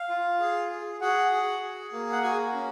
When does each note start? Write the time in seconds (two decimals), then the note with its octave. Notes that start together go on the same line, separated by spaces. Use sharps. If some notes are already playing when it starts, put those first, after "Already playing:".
Already playing: F5
0.09 F4
0.40 G#4
0.70 G#4
1.01 F#4 G#4 F#5
1.32 G#4
1.62 G#4
1.92 A#3
2.12 F#5
2.23 F#4 G#4 G#5
2.53 C#4